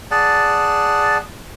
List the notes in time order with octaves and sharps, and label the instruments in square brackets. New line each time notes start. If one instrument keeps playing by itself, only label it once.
[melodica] G#4 D5 F#5 A5